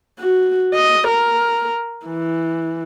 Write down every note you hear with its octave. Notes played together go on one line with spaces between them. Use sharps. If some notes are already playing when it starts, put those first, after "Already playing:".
F#4
D#5
A#4
E3